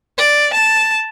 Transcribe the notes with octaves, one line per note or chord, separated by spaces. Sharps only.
D5
A5